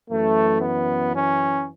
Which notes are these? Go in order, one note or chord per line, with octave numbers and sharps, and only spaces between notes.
F#2 E3 A3
B3
C#4